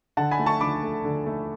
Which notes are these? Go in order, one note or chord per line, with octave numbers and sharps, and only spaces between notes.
D3 F#5 A5
G#5 B5
A3
A5 C#6
D3 B5 D6
A3
D3
A3